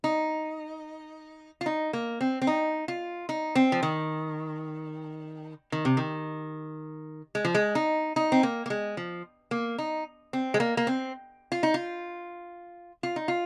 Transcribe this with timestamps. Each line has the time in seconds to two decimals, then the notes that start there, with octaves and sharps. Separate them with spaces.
0.04 D#4
1.61 F4
1.66 D#4
1.93 A#3
2.21 C4
2.42 C4
2.47 D#4
2.88 F4
3.29 D#4
3.55 C4
3.72 F3
3.83 D#3
5.72 D#3
5.85 C3
5.97 D#3
7.35 G#3
7.45 F3
7.55 G#3
7.75 D#4
8.16 D#4
8.32 C4
8.43 A#3
8.66 A#3
8.70 G#3
8.97 F3
9.51 A#3
9.78 D#4
10.33 C4
10.54 G#3
10.60 A#3
10.77 A#3
10.87 C4
11.52 F4
11.63 D#4
11.74 F4
13.03 F4
13.16 D#4
13.28 F4